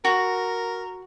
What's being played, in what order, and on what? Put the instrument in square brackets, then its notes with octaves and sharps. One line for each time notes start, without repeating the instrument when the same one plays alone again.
[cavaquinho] F#4 [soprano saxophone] A#4